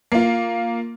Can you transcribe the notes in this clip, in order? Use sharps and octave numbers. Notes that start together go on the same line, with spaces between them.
A#3 F4